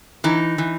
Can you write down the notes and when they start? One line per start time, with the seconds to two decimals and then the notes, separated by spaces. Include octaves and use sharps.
0.24 E3 D#4
0.58 E3